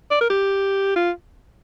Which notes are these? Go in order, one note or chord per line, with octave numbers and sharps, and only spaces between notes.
D5
A#4
G4
F4